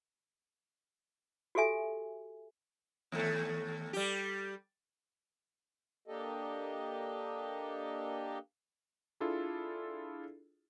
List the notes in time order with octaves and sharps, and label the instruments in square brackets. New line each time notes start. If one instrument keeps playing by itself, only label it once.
[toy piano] F#4 G4 A4 E5 G#5
[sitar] D#2 A3
G3 G4
[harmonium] A#3 D4 G4 A4 D#5
[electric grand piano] D4 E4 F4 G#4 A4